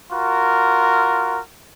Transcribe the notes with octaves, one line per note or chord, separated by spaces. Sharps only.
F4 F#4 A#4